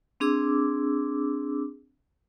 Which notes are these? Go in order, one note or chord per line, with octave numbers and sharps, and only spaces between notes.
C4 D4 G#4 D6 E6